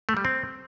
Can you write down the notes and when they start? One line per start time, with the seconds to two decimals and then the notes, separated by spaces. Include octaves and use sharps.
0.09 A3
0.17 G3
0.25 C4